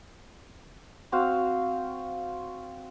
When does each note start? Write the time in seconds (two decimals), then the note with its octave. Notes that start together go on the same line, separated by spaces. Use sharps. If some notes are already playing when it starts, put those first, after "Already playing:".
1.12 C4 F#4 F5